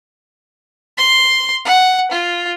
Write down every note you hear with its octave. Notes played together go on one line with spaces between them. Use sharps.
C6
F#5
F4